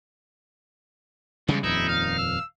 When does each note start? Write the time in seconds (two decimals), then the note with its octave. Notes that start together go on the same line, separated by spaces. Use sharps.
1.48 E2 C#3 G3 G#3
1.64 D#1 F2 D#4 E4
1.89 F5
2.18 E6